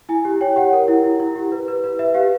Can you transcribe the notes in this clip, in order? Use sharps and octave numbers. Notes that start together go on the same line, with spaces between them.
E4 G#5
G4
C#5 G5
G4 F#5
A#4
E4
E4
E4
G4
B4
B4
B4
B4 E5
G4 F5